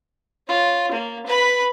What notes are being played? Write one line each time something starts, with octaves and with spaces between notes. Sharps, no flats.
F4 C#5
A#3
B4 B5